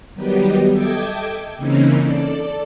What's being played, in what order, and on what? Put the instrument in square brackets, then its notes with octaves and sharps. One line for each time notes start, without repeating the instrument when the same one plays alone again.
[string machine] D#3 F#3 G3 B3 D#4 G4
A4 D#5 E5 G5 D6 G#6
C#3 E3 A#3 C4 C#4 D#4
A4 D5